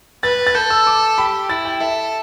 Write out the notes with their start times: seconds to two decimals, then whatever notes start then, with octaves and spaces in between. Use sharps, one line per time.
0.23 B4 A6
0.47 A6
0.55 A4 G6
0.70 E6
0.87 D6
1.18 G4 B5
1.49 E4 A6
1.65 G5
1.80 A4 E5